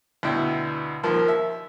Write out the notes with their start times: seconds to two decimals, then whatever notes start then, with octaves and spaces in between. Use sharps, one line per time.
0.23 D2 B2 E4 G5
1.03 D#2 F3 A#3
1.28 E5